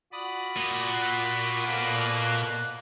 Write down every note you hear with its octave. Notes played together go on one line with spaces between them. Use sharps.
F4 F#4 D5 B5 D#6
A#2
F#6
F2 B2 A#3